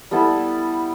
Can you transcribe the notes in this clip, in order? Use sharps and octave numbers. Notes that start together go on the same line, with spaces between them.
G3 B3 E4 A4